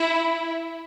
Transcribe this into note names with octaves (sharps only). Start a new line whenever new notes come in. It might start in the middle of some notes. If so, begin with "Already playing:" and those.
Already playing: E4